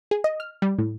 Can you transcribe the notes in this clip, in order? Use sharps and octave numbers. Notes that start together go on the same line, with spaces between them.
G#4
D#5
F6
G3
A2